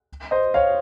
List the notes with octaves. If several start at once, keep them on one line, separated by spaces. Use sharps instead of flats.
C5 D#5
C#5 F5